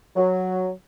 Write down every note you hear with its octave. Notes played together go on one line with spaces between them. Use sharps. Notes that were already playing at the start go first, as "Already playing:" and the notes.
F#3